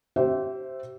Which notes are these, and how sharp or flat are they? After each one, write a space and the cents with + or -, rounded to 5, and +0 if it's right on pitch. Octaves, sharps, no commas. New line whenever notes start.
G4 -35 C5 +0 E5 +0